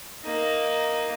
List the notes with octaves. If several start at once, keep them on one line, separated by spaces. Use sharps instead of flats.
A#3 D#4